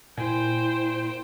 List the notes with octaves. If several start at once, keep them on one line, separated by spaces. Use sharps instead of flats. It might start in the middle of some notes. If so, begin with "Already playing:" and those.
A#2 E4 C5 G5 G#5